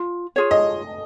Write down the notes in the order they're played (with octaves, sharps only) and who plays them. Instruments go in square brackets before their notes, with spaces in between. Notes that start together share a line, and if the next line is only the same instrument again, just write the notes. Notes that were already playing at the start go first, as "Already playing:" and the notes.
Already playing: [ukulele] F4
F4 G#4 C#5
[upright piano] D#5